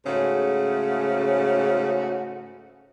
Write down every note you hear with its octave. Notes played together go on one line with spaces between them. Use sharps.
G#2 C#3 A3 C#4 F#4